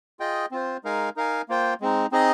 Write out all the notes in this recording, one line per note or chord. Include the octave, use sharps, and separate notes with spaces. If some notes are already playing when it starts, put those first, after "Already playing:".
F4 G#4 D#5 G5
C4 F4 C5
G#3 D#4 A#4 F5 G#5
D#4 A#4 F5 G#5
A#3 F4 C5 G5
G#3 C4 D#4
C4 D#4 G#4 D#5